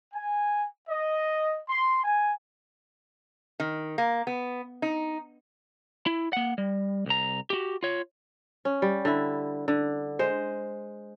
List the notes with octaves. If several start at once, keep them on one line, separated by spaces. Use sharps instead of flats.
G#5
D#5
C6
G#5
D#3
A#3
B3
D#4
E4
A#3 F#5
G3
C2 A#5
F#4 G4
F4 C#5
C#4
G3
D3 E4
D3
G#3 C5